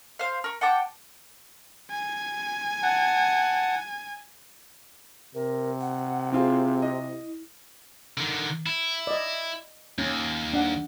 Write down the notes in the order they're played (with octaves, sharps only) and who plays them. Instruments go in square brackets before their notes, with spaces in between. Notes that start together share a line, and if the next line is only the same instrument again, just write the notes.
[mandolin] C5 F5
A#4 C#6
F#5 G5 A5 D6
[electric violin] G#5
[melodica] F#5 A5
[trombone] C3 [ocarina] A#4
[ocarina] F#5
[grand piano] C4 F4 G#4 [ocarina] E4
[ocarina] E4 [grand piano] D#5
[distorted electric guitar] D3 D#3
E4
[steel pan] D5 D#5
[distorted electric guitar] D#2 [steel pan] C#4
[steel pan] D4 F#5